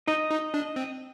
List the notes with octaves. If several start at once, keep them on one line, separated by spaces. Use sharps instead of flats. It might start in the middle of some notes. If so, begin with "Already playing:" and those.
D#4 D#5
D#4
D4
C4